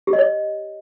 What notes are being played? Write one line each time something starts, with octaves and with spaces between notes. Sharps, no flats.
G4
D#5
C#5